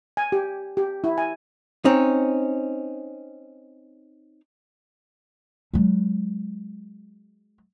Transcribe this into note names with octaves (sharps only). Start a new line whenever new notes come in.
G#5
G4
G4
E4
G#5
C4 C#4 D#4
F#3 G#3